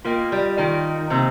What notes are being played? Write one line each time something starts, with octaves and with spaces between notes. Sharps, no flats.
A#3 F4 A#4 D#5 G5
G3
D#3 F4 A#4 D#5 G5
C3 A#3 G4 C5 D#5